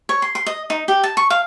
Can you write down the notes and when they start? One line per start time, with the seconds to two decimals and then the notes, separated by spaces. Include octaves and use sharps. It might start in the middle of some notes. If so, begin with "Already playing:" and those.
0.09 C#5
0.22 C6
0.35 C6
0.46 D#5
0.70 D#4
0.88 G4
1.04 A5
1.17 C#6
1.30 F5